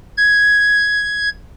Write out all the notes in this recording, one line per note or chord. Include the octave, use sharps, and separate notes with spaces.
G#6